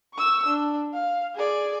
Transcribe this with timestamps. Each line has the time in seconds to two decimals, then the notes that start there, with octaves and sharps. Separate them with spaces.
0.14 C#6 E6
0.47 D4
0.94 F5
1.35 G#4 D5